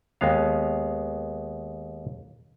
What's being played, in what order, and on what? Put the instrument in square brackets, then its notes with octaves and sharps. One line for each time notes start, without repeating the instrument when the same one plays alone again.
[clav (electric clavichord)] D#2 G#3 B3 F5